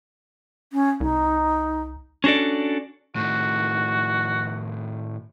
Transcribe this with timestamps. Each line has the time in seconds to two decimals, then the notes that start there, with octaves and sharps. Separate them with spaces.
0.73 C#4
1.00 C2 D#4
2.24 C#4 D4 F#4 A4 D5
3.16 A2 D#3 F#4